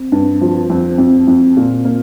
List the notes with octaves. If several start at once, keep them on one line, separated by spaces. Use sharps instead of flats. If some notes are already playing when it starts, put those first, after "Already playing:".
Already playing: C4
G2
F3
F2 C4
F2
F2
A#2
A#3